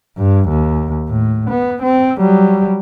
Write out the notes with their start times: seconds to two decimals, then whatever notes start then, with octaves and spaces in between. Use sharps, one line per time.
0.18 G2
0.49 D#2
1.09 A2
1.50 B3
1.83 C4
2.18 F#3 G3